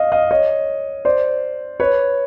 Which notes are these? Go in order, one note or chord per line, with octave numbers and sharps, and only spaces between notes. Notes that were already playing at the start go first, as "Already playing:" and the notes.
Already playing: D#5 F5
D#5 F5
C#5 D#5
C5 D5
B4 C#5